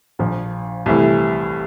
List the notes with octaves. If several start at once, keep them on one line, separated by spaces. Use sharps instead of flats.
A#1 A#2 F3
C2 C3 E3 A3 E4